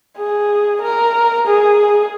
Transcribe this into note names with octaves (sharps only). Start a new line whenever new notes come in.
G#4
A#4
G#4